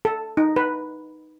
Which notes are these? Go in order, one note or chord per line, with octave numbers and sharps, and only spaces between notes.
A4
D#4
B4